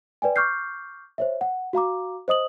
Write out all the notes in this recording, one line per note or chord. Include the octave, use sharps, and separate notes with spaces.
B4 D5 G5 G#5
C#6 D6 F6 G6 C7
C5 C#5 E5
F#5
F#4 F5 A#5 D6
C5 D#5 D#6 F#7